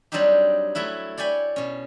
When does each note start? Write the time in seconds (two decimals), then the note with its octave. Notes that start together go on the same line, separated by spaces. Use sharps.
0.12 F#3 G3 C4 D4 D#4 G4
0.75 F#3 A3 E4 B4
1.17 C#5 D5 G5 G#5 B5
1.56 B2 C#4